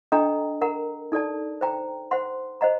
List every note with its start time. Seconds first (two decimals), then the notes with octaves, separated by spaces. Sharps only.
0.12 D4 A4 D#5 G5 A#5
0.61 A#4 F#5 A#5
1.12 D#4 A4 D5 A5
1.61 C5 G5 A#5
2.11 C5 F#5 C6
2.61 C5 D#5 F#5 A#5